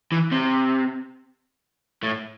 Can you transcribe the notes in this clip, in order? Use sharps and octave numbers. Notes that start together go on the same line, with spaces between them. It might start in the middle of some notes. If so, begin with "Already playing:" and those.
E3
C3
A2